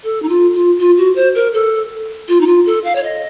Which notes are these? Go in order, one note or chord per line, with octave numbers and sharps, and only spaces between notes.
A4
D#4
F4
F4
F4
F#4
C5
A#4
A4
F4
D#4
F4
A4
F5
C#5
D#5